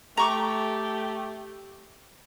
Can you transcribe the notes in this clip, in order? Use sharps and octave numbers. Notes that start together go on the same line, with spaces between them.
A3 G4 A#5 C#6 D6